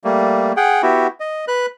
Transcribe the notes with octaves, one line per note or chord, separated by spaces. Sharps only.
G3 A3 A#3
G#4 F#5 G5
B3 E4 F#4 G4
D#5
B4 F#6